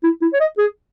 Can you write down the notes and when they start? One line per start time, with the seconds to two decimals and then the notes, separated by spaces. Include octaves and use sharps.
0.03 E4
0.21 E4
0.33 C#5
0.40 D#5
0.58 G#4